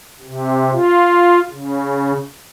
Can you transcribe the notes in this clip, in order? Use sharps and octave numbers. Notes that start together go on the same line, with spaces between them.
C3
F4
C#3